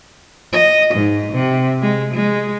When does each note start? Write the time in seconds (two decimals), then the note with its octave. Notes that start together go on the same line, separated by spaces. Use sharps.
0.53 D#5
0.94 G#2
1.32 C3
1.82 G#3
2.13 G#3